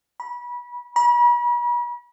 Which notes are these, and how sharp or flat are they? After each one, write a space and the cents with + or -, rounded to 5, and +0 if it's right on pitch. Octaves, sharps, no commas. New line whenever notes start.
B5 -25
B5 -40